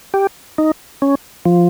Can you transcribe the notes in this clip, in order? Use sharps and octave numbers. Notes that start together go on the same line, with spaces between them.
G4
D#4
C#4
F3